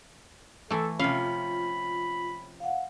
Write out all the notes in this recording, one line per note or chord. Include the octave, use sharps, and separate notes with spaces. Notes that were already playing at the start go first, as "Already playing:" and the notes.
E3 A3 A4
C3 F3 C#4 F4 F5 B5
F5 F#5